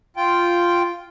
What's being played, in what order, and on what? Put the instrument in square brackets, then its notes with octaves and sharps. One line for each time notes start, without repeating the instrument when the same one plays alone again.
[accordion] F4 G5